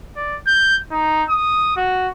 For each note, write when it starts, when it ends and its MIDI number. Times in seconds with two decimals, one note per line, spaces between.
0.16 0.37 74
0.47 0.76 91
0.92 1.23 63
1.30 1.74 87
1.77 2.09 66